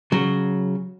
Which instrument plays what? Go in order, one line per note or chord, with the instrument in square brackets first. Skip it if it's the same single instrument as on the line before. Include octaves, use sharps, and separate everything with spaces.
[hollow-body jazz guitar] C#3 F#3